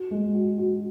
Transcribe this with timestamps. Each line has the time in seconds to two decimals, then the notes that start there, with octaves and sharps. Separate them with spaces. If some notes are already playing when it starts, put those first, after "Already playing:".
Already playing: F#4
0.11 G#3
0.34 F#4
0.58 F#4